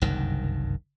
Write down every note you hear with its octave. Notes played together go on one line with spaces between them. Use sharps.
F#1 C2 G2 D#3